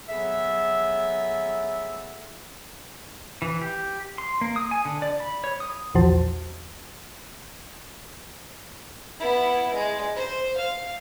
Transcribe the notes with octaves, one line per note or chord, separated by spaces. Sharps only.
F#3 B3 G#4 A4 E5
E3
G4
C6
A#3
D#6
G#5
D3
D5
B5
C#5
D#6
A#1 E2 F3 F#4 C5 A5
B3 E4
G#3
C5
F5